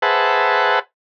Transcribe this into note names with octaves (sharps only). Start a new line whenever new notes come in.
G#4 B4 C5 E5 F#5 A5